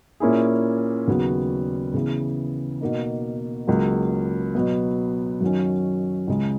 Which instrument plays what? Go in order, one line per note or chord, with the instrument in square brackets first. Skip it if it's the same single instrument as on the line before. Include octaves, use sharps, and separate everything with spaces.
[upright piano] A#2 A#3 C#4 E4 G#4
D#2 C#3 F#3 B3 F#4
C#3 E3 B3
B2 A#3 D#4
C#2 C#3 F#3 A#3
B2 F#3 B3
F#2 D#3 F#3 C#4
C#2 C#3 G#3